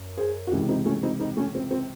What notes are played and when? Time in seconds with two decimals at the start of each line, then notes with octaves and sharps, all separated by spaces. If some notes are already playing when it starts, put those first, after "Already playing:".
Already playing: F#2
0.18 G#4 C5
0.47 F#4
0.52 C#2 C3 E3 C#4 E4
0.69 C4 D#4
0.86 A3 C#4
1.03 C4 D#4
1.20 C4 D#4
1.37 A3 C#4
1.55 C4
1.71 C4